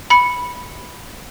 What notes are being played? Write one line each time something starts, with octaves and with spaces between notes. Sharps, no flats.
B5 C#7